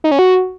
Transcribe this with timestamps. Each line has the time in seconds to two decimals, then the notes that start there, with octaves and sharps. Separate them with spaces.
0.04 D#4
0.11 C#4
0.19 F#4